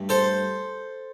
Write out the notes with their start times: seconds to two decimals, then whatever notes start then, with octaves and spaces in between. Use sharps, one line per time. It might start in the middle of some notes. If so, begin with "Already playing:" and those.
Already playing: G2 A3
0.09 A4 C5